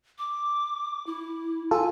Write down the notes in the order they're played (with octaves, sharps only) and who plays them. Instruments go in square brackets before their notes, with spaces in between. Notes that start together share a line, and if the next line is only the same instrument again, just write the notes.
[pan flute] D6
E4
[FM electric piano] F4 A4 [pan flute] G#5